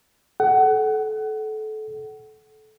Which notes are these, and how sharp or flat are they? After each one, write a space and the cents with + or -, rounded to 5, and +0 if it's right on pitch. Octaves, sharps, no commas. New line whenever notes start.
A4 -25 F#5 +25